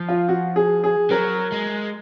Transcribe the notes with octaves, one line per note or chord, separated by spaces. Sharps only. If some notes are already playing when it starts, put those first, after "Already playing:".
Already playing: F3
F4
F#4
G#4
G#4
F#3 A#4
G#3